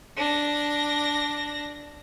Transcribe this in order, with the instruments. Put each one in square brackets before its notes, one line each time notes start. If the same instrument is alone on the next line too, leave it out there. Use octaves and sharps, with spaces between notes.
[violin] D4 A#6